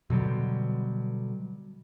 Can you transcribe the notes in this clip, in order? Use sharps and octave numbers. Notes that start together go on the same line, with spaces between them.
B2 D3 F#3 G3